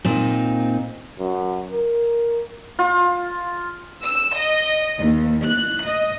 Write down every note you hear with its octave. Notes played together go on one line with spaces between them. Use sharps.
A#2 C4 D#4
F#2
A#4
F4
E6
D#5
D#2
F#6
D#5